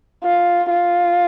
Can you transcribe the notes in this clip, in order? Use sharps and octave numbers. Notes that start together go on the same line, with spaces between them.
F4
F4